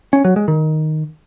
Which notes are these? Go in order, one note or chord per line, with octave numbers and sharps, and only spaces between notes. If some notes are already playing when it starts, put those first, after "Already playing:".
C#4
F#3
G#3
D#3